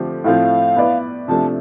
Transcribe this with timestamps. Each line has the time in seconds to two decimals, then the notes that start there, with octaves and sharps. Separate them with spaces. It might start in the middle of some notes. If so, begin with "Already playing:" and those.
Already playing: D3 F3 A3 C4 G4
0.24 A2 F3 A3 C4 F4 F5
0.76 B3 E4 B4 D5
1.28 C3 F3 A3 D4 A5